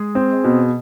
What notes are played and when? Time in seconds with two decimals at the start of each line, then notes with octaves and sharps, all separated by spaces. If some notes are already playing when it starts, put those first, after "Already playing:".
Already playing: G#3 G#4
0.15 C4
0.44 B2